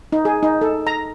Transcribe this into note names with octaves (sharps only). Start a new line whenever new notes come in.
D#4
G#4
D#4
A4
A#5